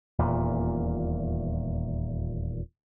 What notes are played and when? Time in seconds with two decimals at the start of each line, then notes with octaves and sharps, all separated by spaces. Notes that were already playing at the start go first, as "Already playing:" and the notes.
0.19 D#1 E2 A#2